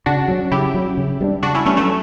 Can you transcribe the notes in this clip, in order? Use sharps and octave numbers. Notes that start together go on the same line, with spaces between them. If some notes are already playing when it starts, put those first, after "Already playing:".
C#3 D4 F#4
F#3 C#4
C#3 E4 G4
F#3 C#4
C#3
G3 B3 D4
C#3 D4 F#4
C#4 E4
G3 A3 B3 C#4 D4
F#3 A3